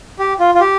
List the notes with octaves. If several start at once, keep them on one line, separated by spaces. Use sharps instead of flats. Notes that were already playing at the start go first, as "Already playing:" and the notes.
G4
F4
F4
G4